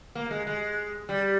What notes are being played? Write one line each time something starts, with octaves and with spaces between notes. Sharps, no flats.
A#3
G#3
G#3
G3